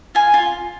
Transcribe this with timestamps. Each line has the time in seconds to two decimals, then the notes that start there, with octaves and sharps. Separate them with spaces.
0.15 F4 G#5
0.34 F4